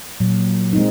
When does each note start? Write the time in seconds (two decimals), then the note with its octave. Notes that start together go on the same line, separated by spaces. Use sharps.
0.20 A#2 F#3
0.73 G#3 C4 D#4